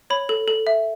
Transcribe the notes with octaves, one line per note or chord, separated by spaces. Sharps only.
C#5 B5
A4
A4
E5